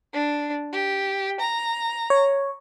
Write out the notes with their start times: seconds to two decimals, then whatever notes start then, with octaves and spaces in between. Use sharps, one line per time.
0.13 D4
0.73 G4
1.40 A#5
2.10 C#5